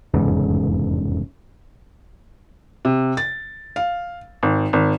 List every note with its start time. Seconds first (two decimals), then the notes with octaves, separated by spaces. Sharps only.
0.14 F1 E2 G#2 C#3
2.85 C3
3.17 A6
3.76 F5
4.43 G#1
4.73 G#1